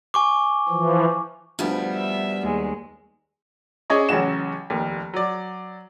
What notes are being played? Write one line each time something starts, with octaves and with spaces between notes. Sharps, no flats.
G#5 C#6 D6
E3 F3
D2 F3 G3 B3
E5
D#2 G#3
C#4 G#4 D5 D#5 C#6
A1 C#3 F#3 C#4 F#4 E7
F1 D#2
F#3 D5